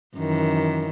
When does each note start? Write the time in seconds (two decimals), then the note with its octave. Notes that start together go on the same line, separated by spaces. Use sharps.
0.17 F#2 D#3 E3